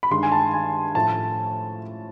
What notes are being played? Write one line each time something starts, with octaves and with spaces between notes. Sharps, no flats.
B5
G2 D#3 G#3 C6
G#5
A5
G#5
A2 F3 A3 A5